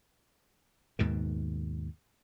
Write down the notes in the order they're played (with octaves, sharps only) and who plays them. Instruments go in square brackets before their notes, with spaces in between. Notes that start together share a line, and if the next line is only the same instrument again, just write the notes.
[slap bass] D#2 G#2 B2 D#3